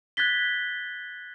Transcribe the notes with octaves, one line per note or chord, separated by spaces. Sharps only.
F#6 G#6 A6 B6 G7